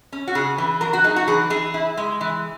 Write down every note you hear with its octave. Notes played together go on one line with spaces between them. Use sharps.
C#4
F#4
C#3 G#4
E3
F#3 A#4
F#4
D#4 G#4
F#4
E3 G#4
E3 G#4
E4
G#3
E3